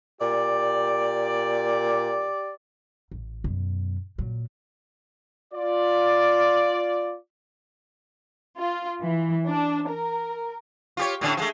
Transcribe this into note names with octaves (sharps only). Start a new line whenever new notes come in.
A#2 G4 D5
A1
F#2 B2
A#2 F#3
F4 D5
F4
E3
D4
A#4
F4 G4 C#5
A2 D3 C#4
F3 G#3 A3